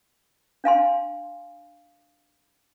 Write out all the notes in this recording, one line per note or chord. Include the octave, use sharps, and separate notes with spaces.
D4 F5 G#5 C6